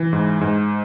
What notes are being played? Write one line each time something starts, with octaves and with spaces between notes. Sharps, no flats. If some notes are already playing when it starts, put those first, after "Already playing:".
Already playing: E3
G#2
G#2